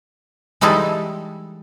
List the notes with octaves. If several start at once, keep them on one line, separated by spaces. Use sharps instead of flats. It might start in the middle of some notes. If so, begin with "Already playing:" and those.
E3 G3 G#3 D#4 E4 A4